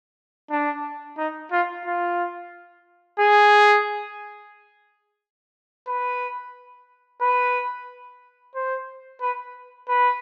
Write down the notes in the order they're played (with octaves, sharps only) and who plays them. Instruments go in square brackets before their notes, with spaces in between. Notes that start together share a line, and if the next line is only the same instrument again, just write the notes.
[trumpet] D4
D#4
F4
F4
G#4
B4
B4
C5
B4
B4